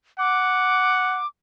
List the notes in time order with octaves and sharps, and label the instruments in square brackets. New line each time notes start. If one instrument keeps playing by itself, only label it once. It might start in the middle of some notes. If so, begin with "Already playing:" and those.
[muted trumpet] F#5 [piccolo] D6